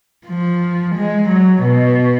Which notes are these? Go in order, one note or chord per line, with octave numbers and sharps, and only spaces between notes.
F3
G#3
F#3
B2